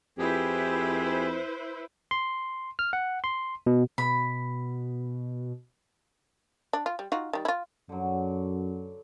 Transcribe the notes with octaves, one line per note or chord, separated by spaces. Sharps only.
F2 E4 G4 G#4 B4 C5
C6
F6
F#5
C6
B2
B2 B5
D4
F4
G3
D#4 F4 F#4
D#3 G3
E4 F4
F#2 D3 F#3